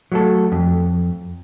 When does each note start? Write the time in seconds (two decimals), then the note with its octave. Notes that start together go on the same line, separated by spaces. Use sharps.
0.12 F#3 A3 A4
0.52 F2